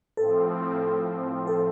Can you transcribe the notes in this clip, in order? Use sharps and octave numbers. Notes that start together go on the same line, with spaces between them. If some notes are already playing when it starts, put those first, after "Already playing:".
A2 F3 C4 A4
A4